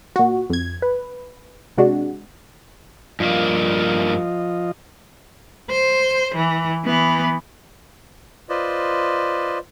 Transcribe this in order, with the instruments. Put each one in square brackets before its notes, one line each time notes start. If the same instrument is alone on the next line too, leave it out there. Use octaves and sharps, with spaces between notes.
[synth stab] A#2 F#4
F2 G#6
B4
C3 G#3 D4 F#4
[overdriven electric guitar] G2 A#3 [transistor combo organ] F3 F4 D#5
[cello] C5
E3
E3 B3
[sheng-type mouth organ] F4 B4 C5 D5 D#5